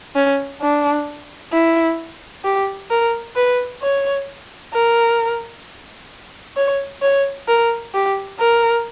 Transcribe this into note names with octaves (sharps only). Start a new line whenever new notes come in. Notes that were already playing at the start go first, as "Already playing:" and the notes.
C#4
D4
E4
G4
A#4
B4
C#5
A#4
C#5
C#5
A#4
G4
A#4